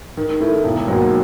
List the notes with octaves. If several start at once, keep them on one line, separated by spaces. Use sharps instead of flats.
D#3
A3 E4
E1
D#2 D#3 F#3